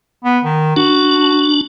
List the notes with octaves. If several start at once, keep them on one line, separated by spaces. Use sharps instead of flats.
B3
D#3
D4 F#4